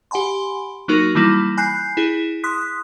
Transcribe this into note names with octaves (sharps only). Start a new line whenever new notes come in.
G4 F#5 G#5 B5 C6
F#3 A#3 D#4 F#4 A#4
E3 G3 A#3 E4
G#5 B5 F#6 G6 C7
E4 G#4
C6 D#6 F#6 B6